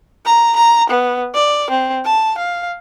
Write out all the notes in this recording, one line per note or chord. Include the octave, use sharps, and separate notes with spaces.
A#5
A#5
B3
D5
C4
A5
F5